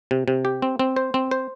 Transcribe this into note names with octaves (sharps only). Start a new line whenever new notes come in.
C3
C3
G4
C4
C4
C5
C4
C5